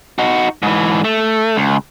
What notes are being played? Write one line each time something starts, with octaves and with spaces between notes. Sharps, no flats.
D#4 F#4
G#2 E3
A3
C#2